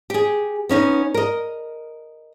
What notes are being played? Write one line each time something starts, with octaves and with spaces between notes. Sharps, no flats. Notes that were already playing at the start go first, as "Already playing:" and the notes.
G4 G#4
B3 C#4 D#4
A#4 D#5